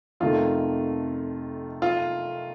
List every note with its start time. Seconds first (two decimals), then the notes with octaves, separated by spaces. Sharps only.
0.20 F2 C3 D#3 A3 F4
1.82 F4